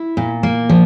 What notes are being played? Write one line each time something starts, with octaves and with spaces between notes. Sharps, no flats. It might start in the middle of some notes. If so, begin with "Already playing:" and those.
Already playing: E4
A#2
A#3
F3